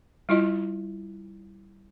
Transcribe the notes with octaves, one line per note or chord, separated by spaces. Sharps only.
G3 E4 F4 D#5